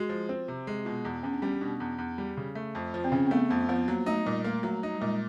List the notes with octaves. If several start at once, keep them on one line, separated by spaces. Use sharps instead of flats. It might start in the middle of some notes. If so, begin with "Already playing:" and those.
Already playing: G#3 F#4
F3
C4
C3
G#3
B2 F4
E2
E2 C#4
D4
G3 C#4
B2 D4
E2
E2
G3
C#3
A3
F2
F3
C4
C#3 C#4
C4
A3 B3
F2 B3
F3 B3
F#3 A#3
A3 D#4
A#2 G3
A3 A#3
F#3 A3
D#4
G3
A#2 G#3